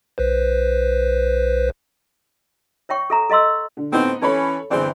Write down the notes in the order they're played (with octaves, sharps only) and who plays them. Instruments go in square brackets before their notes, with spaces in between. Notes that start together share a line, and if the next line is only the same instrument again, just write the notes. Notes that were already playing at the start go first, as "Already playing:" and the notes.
[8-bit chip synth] B1 B4 C5
[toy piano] C#5 E5 G5 C#6
A4 E5 A#5
A4 D#5 F5 C6 E6
[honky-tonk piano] D3
[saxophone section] A2 C4 [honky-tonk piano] B3 D#4
[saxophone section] E3 C#4 [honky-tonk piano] A4 C#5 B5
[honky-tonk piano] G1 G#4 D5 [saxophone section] E3 C4